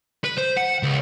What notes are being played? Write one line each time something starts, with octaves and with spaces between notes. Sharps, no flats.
B4
C5
F#5
C#2